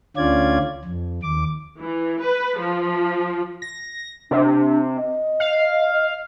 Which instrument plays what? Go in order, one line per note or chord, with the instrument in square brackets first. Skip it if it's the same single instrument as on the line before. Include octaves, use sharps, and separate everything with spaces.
[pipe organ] D2 D3 C#4 F4 D5 G#6
F2
D#2 D6
[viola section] E3
B4
F3
[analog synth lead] A#6
[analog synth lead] C3 [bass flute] D4
[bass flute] D#5
[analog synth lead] F5